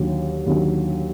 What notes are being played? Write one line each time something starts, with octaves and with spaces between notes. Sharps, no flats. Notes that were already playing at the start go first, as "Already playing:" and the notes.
Already playing: D#2 D3 F#3
D#2 D3 F#3